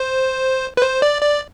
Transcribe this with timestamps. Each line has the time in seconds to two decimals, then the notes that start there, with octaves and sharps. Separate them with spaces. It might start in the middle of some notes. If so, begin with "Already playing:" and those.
Already playing: C5
0.77 B4
0.82 C5
1.02 D5
1.22 D5